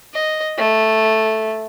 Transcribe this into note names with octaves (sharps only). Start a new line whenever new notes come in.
D#5
A3